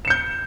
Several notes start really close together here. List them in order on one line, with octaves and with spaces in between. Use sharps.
E7 C#7 G6